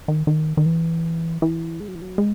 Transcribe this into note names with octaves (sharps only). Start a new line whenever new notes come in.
D#3
D#3
D#3
E3
E3
G#3
F#3
E3
F#3
G#3